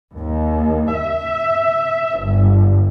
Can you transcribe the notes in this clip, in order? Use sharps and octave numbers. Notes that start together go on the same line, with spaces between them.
D#2
E5
G1